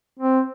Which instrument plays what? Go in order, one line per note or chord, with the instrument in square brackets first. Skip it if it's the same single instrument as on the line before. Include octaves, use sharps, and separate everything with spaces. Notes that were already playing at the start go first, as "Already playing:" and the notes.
[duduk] C4